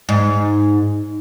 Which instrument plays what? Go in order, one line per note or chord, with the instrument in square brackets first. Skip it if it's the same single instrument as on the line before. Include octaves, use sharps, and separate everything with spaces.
[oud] G#2